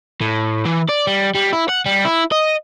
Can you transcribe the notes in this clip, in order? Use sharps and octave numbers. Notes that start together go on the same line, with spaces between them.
A2
E3
D5
G3
G3
E4
F#5
G3
E4
D#5